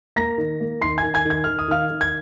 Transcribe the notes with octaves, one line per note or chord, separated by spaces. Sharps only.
A#3 A#5 A#6
D#3
A#3
D#3 C6 C7
G#5 G#6
D#3
G#5 G#6
D#3 G#6
D#3 F6
D#6
D#3 F5 F6
D#3
G#6